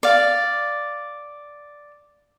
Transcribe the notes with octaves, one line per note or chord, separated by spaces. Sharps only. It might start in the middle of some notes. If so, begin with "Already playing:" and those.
D5 F5